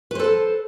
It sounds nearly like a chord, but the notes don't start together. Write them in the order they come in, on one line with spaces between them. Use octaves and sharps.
B4 C5 A4 A5